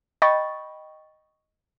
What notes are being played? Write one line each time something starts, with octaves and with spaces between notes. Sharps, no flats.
D#5 G5 B5 C#6 A6